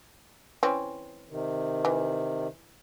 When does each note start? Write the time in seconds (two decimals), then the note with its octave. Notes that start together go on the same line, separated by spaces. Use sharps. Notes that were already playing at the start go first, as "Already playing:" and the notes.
0.63 E3 C4 C#4
1.30 C3 D#3
1.85 E3